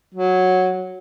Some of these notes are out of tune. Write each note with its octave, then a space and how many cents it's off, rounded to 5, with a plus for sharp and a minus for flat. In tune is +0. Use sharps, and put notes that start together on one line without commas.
F#3 -5